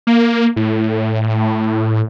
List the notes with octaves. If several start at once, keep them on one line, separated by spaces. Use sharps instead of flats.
A#3
A2